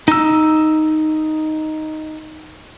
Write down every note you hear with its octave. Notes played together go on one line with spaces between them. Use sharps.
D#4 E6